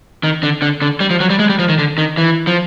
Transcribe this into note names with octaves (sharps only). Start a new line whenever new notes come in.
D#3
D3
D3
D3
G3
F3
F#3
G3
G#3
G3
F3
D#3
D3
D#3
E3
F3